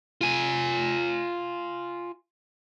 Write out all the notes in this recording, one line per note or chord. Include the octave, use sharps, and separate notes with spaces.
F4 G#5